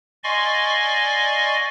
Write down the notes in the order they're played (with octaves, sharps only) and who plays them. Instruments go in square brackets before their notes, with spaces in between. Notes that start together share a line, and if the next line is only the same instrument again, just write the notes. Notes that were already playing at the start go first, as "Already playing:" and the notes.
[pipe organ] D5 D#5 F5 G#5 C6 C#6